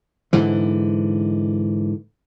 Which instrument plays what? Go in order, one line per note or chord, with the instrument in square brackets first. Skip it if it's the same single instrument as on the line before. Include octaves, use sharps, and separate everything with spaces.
[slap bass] G#2 D3 E3